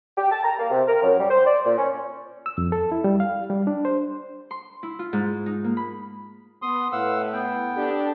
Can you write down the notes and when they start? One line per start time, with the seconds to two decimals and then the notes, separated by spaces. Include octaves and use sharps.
0.17 G4
0.32 A5
0.44 A#5
0.59 A#3
0.71 C3
0.88 A#4
1.03 F#2
1.19 G3
1.30 C5
1.46 D5
1.65 A#2
1.78 C#4
2.46 E6
2.58 F2
2.72 A4
2.92 E4
3.04 G3
3.20 F5
3.50 G3
3.67 D4
3.85 C5
4.51 C6
4.83 E4
4.99 F4
5.13 G#2
5.46 D#4
5.64 A#3
5.77 B5
6.62 B3 C6 D#6
6.92 A2 B4 F5 F#5 E6
7.33 B3 G5
7.76 D4 G4 A4